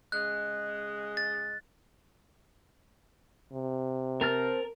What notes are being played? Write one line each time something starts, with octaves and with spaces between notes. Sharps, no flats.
C#3 G#3 F#6
A6
C3
C4 A#4 A5 F6